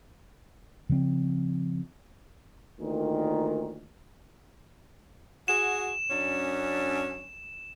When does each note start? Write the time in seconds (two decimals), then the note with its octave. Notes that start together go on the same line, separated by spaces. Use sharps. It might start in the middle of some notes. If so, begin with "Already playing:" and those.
0.89 C#3 F3 C4
2.79 D2 A#2 D#3
5.48 F#4 G#4 E7
6.10 F#2 C#4 D4